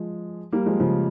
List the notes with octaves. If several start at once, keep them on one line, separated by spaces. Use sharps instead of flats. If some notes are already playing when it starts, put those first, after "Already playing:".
Already playing: F3 G#3
G3 A#3
F3 G#3
C#3 F3